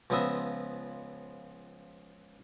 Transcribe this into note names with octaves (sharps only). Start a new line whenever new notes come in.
C#2 F3 B3 D#5 E5 D#6